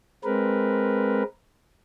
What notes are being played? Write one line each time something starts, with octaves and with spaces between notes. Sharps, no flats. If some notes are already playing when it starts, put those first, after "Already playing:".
G#3 C4 A#4 B4